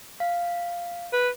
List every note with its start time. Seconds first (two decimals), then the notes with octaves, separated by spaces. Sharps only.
0.20 F5
1.13 B4